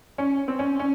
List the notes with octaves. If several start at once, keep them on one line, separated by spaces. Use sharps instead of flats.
C#4
C4
C#4
C#4